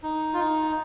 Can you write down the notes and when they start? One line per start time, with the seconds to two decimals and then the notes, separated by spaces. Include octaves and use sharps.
0.03 D#4
0.33 F4
0.39 D#4